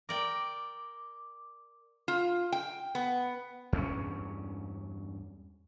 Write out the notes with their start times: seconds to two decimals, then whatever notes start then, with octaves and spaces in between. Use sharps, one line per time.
0.09 A#4 D5 G5 D6
2.08 F4
2.52 G5
2.95 B3
3.73 E2 G2 A#3 C#4